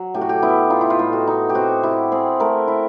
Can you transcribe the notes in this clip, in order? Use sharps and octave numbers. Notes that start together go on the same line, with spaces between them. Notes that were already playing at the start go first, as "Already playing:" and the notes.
Already playing: F#3
A2 G4
F#4
G4
B3 E4
D#4 F4
E4
F4
A2
F#4
D#4
G4
C4 F#4
E4 G4
C4 G#4
A3 A#4
E4